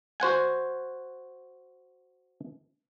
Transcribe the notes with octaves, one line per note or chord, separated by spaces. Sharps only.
F#4 C5 F#5 G#5